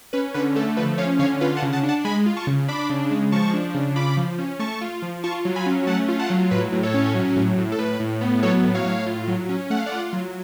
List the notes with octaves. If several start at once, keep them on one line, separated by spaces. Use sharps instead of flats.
C#4 B4
D3 B4
A3 A4
F3 B4
C#4 C#5 F5
D3 C#5 F5
F4 B4
F#5 A5
C#3
F#5 A5
D4
F#5 A5
G#3 G#5 B5
F4
A5 C#6
C#3
D4 B5 D6
C#3
G#3
F3 A5 C#6
D4
C#3
F4 B5 D6
F3
C#4
A3 A5 C#6
F4
F3
F4 A5 C#6
F#3
G#5 B5
C#4
A3 F#5 A5
F4
F#5 A5
F#3
A2 B4
A2
A4 C#5
C#4
F#3
A2
A2
A4
A2 B4
A2
B3
F#3 A4 C#5
A2
C#5 F5
A2
F4
F#3
C#4
A3 F#5
F5
D5 F#5
F4
F#3